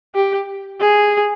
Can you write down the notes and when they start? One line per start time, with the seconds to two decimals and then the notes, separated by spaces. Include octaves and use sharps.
0.15 G4
0.80 G#4